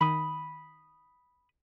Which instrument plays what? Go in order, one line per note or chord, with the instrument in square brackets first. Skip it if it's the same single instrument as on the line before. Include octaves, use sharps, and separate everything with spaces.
[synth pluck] D#3 [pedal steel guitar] B5 D#6